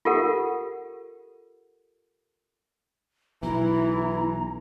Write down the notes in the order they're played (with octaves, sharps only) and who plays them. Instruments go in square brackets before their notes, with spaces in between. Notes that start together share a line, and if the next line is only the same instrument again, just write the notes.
[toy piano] F4 G4 A4 A#4 F#5
[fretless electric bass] B1 [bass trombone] E3 [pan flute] E4 [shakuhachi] A#5